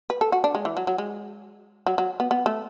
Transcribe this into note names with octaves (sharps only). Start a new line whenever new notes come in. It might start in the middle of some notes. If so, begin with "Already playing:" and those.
B4
A4
F#4
D4
G#3
E3
F#3
F#3
G#3
F#3
F#3
B3
B3
A3